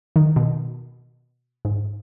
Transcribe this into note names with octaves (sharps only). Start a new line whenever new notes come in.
D#3
B2
G#2